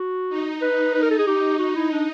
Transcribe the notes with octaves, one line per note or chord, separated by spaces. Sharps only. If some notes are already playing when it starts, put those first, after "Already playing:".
Already playing: F#4
D#4
B4
D#4 B4
A#4
A4
G#4
G4
F#4
E4
D4